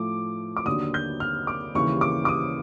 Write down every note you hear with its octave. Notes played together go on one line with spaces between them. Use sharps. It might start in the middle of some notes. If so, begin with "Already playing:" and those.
Already playing: A2 F3 A3 D6
D6
D#2 D3 F#3 D#6
G6
F6
D6
D#2 C#3 E3 G3 C#6
D6
D6
D#6